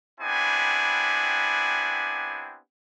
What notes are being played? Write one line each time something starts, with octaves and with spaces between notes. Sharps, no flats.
B3 C4 D4 E4 G4 G#5